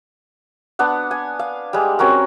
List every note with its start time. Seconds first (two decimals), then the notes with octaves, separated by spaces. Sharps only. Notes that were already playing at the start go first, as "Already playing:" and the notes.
0.79 B3 D4 F#5
1.11 G#5
1.39 F5
1.73 G3 G#3
1.99 C4 C#4 F#4 A#4